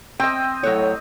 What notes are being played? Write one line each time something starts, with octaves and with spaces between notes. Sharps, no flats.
C4 D#5 G5
A2 F#3 C#5